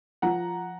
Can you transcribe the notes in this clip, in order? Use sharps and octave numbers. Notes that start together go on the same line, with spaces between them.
F3 F#5 A#5